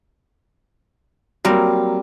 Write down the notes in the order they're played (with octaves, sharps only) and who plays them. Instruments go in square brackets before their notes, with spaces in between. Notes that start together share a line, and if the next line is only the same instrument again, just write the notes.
[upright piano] F#3 A#3 [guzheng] G3 C4 A#4